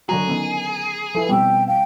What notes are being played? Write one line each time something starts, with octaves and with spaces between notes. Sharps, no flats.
D3 F#3 F#4 G#4 A#5
D#3 B3 C#4
F3 E4 A4 B4
B2 G3 C4 G4 G5 E6
F5 G5